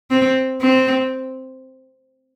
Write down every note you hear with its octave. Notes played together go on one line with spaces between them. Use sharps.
C4
C4